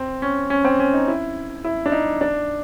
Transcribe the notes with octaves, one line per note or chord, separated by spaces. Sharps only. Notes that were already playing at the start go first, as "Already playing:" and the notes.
Already playing: C4
C#4
C#4
C4
C#4
D#4
E4
E4
D4
D#4
D4